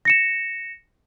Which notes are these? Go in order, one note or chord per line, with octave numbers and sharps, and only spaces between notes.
A#6 C#7 E7